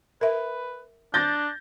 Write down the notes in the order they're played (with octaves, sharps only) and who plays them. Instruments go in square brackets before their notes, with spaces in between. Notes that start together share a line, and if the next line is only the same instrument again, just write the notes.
[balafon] A#4 E5 [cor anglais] B4
[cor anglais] D4 [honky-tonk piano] G6 A6 A#6